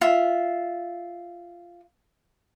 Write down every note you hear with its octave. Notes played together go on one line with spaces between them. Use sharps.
F4 E5